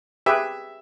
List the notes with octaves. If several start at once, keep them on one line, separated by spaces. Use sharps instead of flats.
G4 G#4 B4 E5